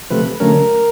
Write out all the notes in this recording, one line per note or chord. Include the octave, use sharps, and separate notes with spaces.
C3 F3 A3 B4
D3 F#3 A3 C#4 A#4